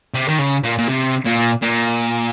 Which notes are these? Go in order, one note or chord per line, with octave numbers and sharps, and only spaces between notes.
C3
D#3
C#3
A#2
A#2
C3
A#2
A#2